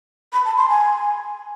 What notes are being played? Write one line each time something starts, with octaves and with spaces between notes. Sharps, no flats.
B5
A5
C6
G#5